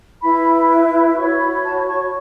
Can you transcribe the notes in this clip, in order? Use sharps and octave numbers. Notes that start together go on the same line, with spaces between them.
E4 B4 B5
F#4 C#5 C#6
B5
A5
C#6